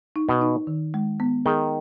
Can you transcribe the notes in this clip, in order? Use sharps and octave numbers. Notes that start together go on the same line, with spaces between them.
D#4
B2
D#4
D#3
G#3
B3
D#3 G#4